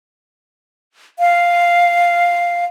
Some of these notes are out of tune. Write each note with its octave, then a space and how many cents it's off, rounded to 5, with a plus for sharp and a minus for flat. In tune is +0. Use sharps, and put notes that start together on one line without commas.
F5 +0